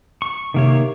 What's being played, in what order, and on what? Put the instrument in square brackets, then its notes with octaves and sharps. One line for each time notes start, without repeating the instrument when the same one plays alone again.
[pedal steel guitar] C#6
[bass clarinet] C3 [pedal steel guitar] D#3 A#3 C#5